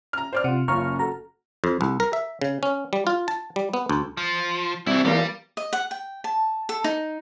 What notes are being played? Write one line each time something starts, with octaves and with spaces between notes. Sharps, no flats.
A#5 F6
C5 D5 F6
C3 F4 F#5
F#1 C#4 F4 A#5 C#6 F6
F#4 A4 A#5
F2
C2
A#4
E5
C#3
C#4
G3
F4
A5
G3
B3
D2
F3
C2 F#3 E4
E2 G3 A#3
D#5
F#5
G5
A5
A4
D#4